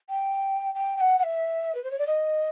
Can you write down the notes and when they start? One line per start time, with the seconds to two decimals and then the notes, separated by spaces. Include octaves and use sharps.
0.09 G5
0.74 G5
0.96 G5
1.00 F#5
1.18 F#5
1.23 E5
1.74 B4
1.83 C5
1.91 C#5
1.98 D5
2.07 D#5